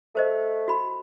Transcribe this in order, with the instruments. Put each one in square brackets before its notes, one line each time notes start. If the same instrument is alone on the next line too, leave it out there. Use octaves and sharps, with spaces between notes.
[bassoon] A3 [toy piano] A#4 C5 D#5
[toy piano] F#4 B5